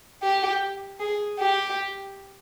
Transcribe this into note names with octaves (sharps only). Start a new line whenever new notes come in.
G4
G#4
G4